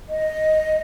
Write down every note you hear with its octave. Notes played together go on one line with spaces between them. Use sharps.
D#5